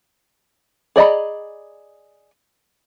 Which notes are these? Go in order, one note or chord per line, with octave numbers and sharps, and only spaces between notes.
G#4 D5 D#5 A#5 B5